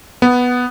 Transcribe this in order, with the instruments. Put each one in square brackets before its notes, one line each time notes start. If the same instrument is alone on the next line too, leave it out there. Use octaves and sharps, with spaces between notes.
[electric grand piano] B3